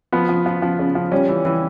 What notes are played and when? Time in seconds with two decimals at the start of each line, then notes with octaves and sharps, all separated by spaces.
0.12 F3 B3
0.29 F3
0.46 F3
0.62 F3
0.79 C#3
0.95 F3
1.12 G3 C#4
1.29 E3
1.45 E3